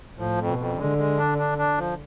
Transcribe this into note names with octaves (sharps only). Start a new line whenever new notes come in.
A2 F3
F2
B2
F2
D3 G#3
G#3
D4
D4
D4
F3